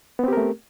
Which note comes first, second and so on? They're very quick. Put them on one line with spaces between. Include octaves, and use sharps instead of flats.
B3 C4 G4 A#4 A3